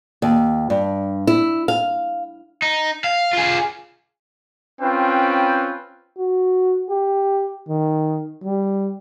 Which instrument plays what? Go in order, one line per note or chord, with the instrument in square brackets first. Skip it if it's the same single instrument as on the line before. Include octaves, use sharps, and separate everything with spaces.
[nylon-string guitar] D#2
G2
E4
F5
[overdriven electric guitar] D#4
F5
F4 G#4
[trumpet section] C4 C#4 F4 B4 G5
[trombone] F#4
G4
D#3
G3